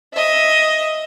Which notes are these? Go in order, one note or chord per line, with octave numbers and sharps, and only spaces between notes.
D#5 E5